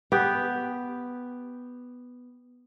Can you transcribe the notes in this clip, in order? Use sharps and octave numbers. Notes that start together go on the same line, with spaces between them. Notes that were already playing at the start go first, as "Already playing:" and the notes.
B3 G4